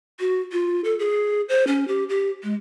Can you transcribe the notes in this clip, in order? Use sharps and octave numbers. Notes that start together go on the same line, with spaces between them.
F#4
F4
A4
G#4
C5
C#4
G4
G4
G#3